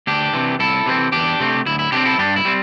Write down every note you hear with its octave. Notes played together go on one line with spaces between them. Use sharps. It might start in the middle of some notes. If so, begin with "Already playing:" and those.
D2 D4 G4
C3 E3
C2 E4 A4
C3 E3 G3 C4
E2 D4 G4
C3 A3 C4
D2 E4
E4
C3 A3 C4 D4 G4
E4 A4
G2 D4 G4
E4
G3 C4